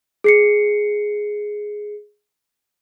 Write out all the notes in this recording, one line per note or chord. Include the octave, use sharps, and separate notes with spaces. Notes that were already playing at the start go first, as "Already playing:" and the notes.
G#4 C7 C#7